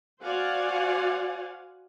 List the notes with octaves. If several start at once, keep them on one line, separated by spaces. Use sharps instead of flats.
F#4 C5 D5 F5 F#5 G#5